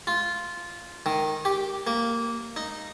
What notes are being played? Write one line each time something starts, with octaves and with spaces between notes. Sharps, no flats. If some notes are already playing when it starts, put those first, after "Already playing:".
F4
D#3
G4
A#3
D#4